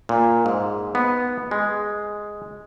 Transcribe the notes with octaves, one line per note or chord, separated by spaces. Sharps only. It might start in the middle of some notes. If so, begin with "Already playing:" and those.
A#2
G#2
B3
G#3